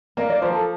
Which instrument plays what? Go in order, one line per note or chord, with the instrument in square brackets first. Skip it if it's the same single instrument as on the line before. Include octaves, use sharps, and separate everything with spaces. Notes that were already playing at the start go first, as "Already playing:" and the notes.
[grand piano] A#3 [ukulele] A#4 D5
[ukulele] A#4 D5
[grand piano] F3 [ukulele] C5
[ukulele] A4